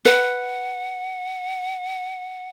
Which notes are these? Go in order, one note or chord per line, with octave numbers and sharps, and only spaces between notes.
B4 F#5